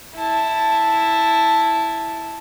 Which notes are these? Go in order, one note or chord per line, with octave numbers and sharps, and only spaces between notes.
E4 A5